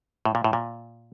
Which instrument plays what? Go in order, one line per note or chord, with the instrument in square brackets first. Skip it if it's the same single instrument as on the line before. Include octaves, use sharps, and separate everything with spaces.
[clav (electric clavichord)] A2
A#2
A2
A#2